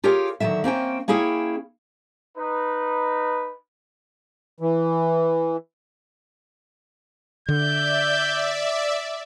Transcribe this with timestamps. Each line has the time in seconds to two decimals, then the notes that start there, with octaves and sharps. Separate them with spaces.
0.04 F4 G4 G#4 A#4 C#5
0.40 D3 D#3 F#3 A3 E5
0.64 A#3 C4 C#4 G5
1.08 A#3 C#4 E4 G#4 C#5 G5
2.38 D#4 B4
4.60 E3
7.48 D3 D5 E5 G6